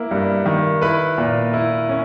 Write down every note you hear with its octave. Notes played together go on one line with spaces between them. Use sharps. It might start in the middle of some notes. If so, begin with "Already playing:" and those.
Already playing: A#3 E4
G2
D#3
E4 B4 B5
A#2
E4
C#4